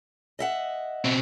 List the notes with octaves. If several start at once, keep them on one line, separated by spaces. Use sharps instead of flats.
D#5 E5 F#5
B2 C4